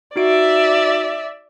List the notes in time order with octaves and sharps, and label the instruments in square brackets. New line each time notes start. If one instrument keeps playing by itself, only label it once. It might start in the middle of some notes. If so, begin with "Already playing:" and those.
[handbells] D#4 F#4 D7 [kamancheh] D5 E5